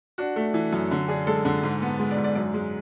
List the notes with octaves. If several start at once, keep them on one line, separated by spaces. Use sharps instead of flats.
D4 F#4
A3
E3
F#2
D3
D4 G#4
G#3 A4
D3
G#2
B3
G#3
D5
G#2
D5
F#2 D5
G#3